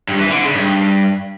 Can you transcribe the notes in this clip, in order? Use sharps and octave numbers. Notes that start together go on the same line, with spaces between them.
G2
E3
D3
C#3
G2